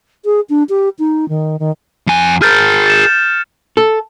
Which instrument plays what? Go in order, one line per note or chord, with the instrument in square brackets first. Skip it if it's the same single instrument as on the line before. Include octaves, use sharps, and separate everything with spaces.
[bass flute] G#4
D4
G4
D#4
D#3
D#3
[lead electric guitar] F2 G#5
[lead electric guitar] G#4 A#4 [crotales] F6 G6 A6
[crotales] A6 C#7 E7
[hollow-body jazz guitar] A4